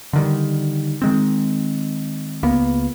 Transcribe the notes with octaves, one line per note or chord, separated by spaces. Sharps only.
D3 D#3 G3
D#3 G#3 C4
C#2 A#3 B3